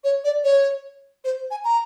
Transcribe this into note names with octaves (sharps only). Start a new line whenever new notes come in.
C#5
D5
C#5
C5
G#5
A#5